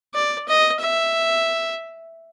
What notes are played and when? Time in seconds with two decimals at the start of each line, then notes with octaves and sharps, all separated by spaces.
0.14 D5
0.48 D#5
0.80 E5